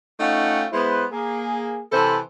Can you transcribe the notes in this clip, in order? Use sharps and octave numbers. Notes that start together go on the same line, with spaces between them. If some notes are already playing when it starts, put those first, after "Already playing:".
A3 C#4 D#4 F4 F#5 G5
G#3 B3 E4 B4 C5
A#3 G#4
C3 E3 A4 C5 A5 B5